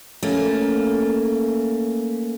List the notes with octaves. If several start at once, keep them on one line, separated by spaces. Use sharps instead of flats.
A3 A#3 C#4